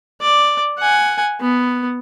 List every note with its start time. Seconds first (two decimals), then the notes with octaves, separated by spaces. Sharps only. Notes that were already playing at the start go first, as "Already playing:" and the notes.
0.21 D5
0.78 F#5 G#5
1.40 B3